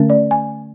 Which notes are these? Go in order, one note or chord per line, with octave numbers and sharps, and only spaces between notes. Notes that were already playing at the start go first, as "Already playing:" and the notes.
Already playing: D3 A3 C#4
D5
G#5